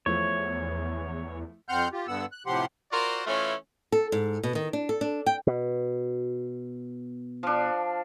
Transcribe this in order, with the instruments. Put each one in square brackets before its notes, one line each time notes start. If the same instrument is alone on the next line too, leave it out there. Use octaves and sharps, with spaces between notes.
[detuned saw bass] E2 [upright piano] F3 A3 E4 [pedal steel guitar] C#5
[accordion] F2 C4 F#5 C6 F6 G6
F4 G4
G2 D3 B3 F#5 E6
F#6
A2 C3 F3 G4 F#5 C6
[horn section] F4 F#4 A#4 C5 D5
E3 A3 C#4 E4 F4
[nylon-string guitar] A4
G#2
B2
D#3
D4
A4
D4
G5
[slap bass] B2
[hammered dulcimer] F3 D4